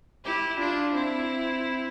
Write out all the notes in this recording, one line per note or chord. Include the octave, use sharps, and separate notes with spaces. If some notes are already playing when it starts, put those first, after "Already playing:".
E4 G4
D4 F4
C4 E4